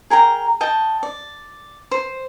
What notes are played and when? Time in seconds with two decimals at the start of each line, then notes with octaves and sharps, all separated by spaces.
0.10 G#4 A#4 G5 A#5
0.61 D#5 G5 A5
1.03 D5
1.91 C5